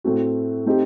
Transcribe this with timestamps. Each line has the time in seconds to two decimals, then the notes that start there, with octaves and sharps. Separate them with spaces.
0.04 A2 A3 C4 F#4
0.66 A3 C4 D#4 G4